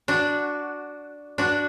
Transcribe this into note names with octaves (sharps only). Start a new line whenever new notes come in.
D4 F#4
D4 F#4